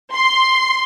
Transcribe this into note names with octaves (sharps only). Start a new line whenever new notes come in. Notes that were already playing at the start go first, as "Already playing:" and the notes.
C6